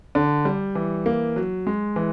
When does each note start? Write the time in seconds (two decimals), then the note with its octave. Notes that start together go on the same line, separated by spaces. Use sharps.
0.15 D3
0.45 G3
0.75 E3
1.06 A#3
1.36 F#3
1.67 G#3
1.96 E3